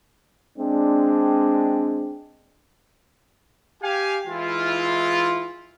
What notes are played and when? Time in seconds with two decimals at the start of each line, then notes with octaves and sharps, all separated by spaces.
0.58 G#3 C4 D4
3.83 G4 F5 G#5
4.27 E3 G#3 E4 F4